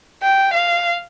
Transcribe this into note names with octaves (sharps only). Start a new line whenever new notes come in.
G5
F5